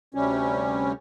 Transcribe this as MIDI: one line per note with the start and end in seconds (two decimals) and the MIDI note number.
0.15 0.92 38
0.15 0.92 48
0.15 0.92 55
0.15 0.92 61